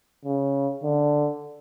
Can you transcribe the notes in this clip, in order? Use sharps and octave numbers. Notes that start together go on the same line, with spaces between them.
C#3
D3